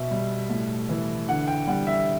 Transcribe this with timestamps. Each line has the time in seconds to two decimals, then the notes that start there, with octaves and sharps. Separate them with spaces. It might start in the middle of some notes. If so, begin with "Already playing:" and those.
Already playing: B2 E5
0.11 G3
0.50 A2
0.89 E3
1.29 D3 F#5
1.48 G5
1.67 G3 F#5
1.87 E5